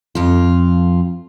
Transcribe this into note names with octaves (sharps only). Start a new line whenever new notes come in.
F2 F4